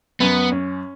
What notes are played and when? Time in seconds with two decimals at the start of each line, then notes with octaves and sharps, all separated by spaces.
0.20 F#2 B3
0.52 C#4